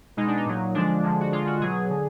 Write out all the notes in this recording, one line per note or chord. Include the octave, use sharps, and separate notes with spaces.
B2 G#3 D#4
D4
D#4
A#2 F#3
D3 F3 G#3 D4
D3 F3 G#3
F#4
D3 G#3 F4
F#4
B2 F#3 G#4
D3